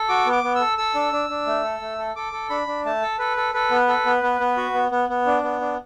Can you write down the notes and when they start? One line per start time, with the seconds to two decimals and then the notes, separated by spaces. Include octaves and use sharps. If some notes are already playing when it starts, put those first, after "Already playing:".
Already playing: A4
0.09 F#4 D6
0.26 B3
0.32 D6
0.43 B3
0.55 A4 E6
0.77 A4 E6
0.95 D4
1.13 D4
1.29 D4
1.46 A3
1.64 A4
1.81 A3
1.99 A4
2.16 A4 D6
2.33 A4
2.50 D4 B5
2.67 D4
2.85 A3 A5
3.02 A4
3.19 A4 B4
3.37 A4
3.54 A4 B4
3.71 B3
3.88 A4
4.06 B3
4.23 B3
4.40 B3
4.57 F#4
4.74 B3
4.91 B3
5.09 B3
5.26 D4
5.43 B3
5.61 D4